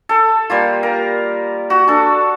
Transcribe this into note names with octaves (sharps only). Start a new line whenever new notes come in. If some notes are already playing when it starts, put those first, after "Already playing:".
A4
G3 A#3 F4
A#4
F#4
D4 A4